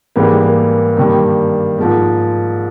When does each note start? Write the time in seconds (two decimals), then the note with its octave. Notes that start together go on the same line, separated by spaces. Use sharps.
0.16 G#2 E3 G3 A#3
0.43 A#3
0.97 G2 D#3 G3 A#3
1.78 G#2 F3 G#3 A#3